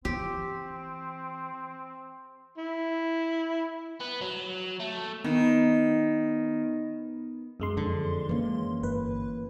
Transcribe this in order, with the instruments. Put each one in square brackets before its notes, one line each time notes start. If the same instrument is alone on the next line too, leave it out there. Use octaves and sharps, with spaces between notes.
[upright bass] E3 [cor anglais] C4 [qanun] G4
[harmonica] E4
[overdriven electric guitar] B3
F#3
A3
[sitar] D#3 [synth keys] B3
[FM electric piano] F#2 G#3 C6
[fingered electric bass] F2 D3
E3 A#3 C#4
[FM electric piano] G1 B4